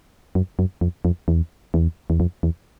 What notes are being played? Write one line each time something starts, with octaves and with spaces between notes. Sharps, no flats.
F#2
F#2
F2
F2
E2
E2
E2
F2
E2